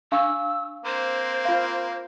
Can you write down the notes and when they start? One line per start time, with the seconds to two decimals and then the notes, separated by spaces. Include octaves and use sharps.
0.12 D4 F5 C#6 E6
0.85 A#3 C4 C5
1.45 F4 F5